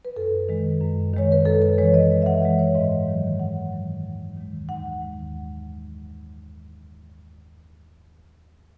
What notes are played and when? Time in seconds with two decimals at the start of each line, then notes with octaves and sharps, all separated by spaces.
0.05 B4
0.16 F#2 A4
0.49 D#3 G#3
0.81 F#2
1.13 D#3 G#3 C#5
1.32 B4
1.45 F#2 A4
1.62 B4
1.78 E3 G#3 C#5
1.94 D#5
2.10 F#2
2.22 E5
2.26 F#5
2.43 E3 E5
2.45 G#3
2.59 C#5
2.75 G#2 D#5
3.07 D#3 F#3
3.39 G#2 F#5
3.72 D#3 F#3
4.04 D#2
4.37 D#3 G#3
4.69 D#2 F#5
5.01 D#3 G#3